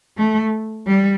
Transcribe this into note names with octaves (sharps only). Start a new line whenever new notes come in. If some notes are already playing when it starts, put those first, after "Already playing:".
A3
G3